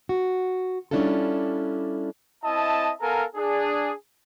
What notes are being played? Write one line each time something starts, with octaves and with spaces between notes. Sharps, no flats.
F#4
G3 C#4 D4 E4 F4 A4
C4 E4 D#5 E5 A5
B3 A4 A#4 F5 G#5 A#5
D4 G#4